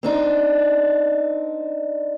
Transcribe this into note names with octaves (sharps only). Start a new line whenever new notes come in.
C4 D4 D#4